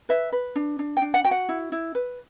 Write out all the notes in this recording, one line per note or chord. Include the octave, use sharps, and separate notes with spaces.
B4 E5
B4
D4
D4
G5
D4
F#5
F#4 G5
F#5
E4
E4
B4